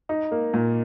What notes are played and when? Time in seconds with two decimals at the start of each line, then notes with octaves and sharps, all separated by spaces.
0.09 D#4
0.31 A#3
0.54 A#2